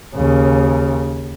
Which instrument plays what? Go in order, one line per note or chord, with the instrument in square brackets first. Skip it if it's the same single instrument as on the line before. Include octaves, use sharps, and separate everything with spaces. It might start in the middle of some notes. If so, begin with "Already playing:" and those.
[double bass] D#2 C#3